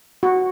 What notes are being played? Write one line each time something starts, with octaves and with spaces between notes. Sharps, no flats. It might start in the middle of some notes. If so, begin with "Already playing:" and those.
F#4